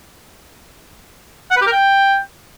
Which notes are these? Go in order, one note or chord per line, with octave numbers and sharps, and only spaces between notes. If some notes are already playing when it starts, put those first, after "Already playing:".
F#5
B4
G4
A#4
G5